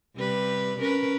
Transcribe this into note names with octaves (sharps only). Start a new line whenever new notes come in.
C3 G3 B4
C#4 A#4 B4